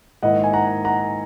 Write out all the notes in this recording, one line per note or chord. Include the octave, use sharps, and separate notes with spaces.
G#2 D#3 A#3 E4 D#5 F#5
G#5
F#5 A#5
F#5 A#5